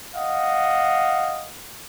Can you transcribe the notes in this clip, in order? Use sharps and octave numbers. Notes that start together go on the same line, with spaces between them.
D#5 F5 F#5